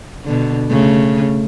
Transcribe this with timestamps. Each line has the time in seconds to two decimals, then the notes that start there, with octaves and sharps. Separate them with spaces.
0.24 B2 D3
0.70 C#3 A3